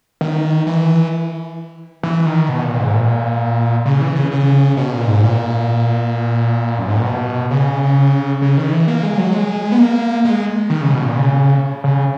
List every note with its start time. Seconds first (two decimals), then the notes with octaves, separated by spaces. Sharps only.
0.21 D#3
0.67 E3
2.03 E3
2.26 D#3
2.49 B2
2.64 A#2
2.80 G#2
2.95 A#2
3.86 C#3
4.01 E3
4.16 C#3
4.31 C#3
4.77 B2
4.92 A#2
5.07 G#2
5.23 A#2
6.78 F#2
6.88 G#2
6.96 A#2
7.05 B2
7.51 C#3
8.42 C#3
8.57 D#3
8.72 E3
8.88 A#3
9.03 G#3
9.18 F#3
9.33 G#3
9.72 B3
9.79 A#3
10.25 G#3
10.70 D#3
10.81 C#3
10.93 B2
11.04 A#2
11.16 C#3
11.84 C#3